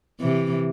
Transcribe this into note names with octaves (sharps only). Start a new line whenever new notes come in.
C3 E3